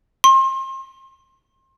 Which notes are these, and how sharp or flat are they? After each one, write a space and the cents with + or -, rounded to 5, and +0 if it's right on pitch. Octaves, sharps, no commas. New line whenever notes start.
C6 +35